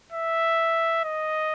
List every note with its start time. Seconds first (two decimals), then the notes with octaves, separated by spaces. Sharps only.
0.13 E5
1.05 D#5